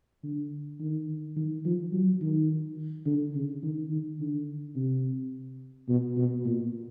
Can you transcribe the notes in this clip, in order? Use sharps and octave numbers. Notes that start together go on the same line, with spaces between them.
D3
D#3
D#3
F3
F#3
D#3
D3
C#3
D#3
D#3
D3
C3
B2
B2
A#2